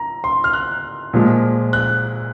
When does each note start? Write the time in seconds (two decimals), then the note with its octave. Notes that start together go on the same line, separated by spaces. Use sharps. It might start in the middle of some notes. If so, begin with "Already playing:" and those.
Already playing: A#5
0.24 C6
0.44 F6
0.54 F#6
1.13 A#2 F3 G#3
1.73 F#6